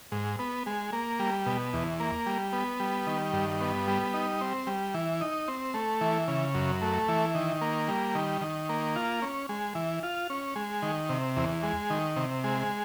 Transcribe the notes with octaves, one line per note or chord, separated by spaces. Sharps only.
G#2
B3
G#3
A#3
G3
B2
E2
A#3
G3
B3
G3
D#3
G2
B3
G3
D#4
C4
G3
E3
D#4
C4
A3
E3
C#3
F#2
A3
E3
D#3
A#3
G3
D#3
D#3
A#3
F4
C#4
G#3
E3
F4
C#4
G#3
D#3
C3
E2
G#3
D#3
C3
G#3